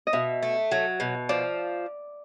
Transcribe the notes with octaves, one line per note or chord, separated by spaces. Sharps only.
D#5
B2 E5
A3
F#3
B2
F3 D5